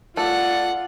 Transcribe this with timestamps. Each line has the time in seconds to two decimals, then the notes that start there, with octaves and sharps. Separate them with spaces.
0.17 A3 F4 D5 F#5